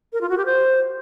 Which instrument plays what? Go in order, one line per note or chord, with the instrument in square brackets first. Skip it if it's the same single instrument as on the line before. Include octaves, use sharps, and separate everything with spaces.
[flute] A#4
F4
F#4
G4
C5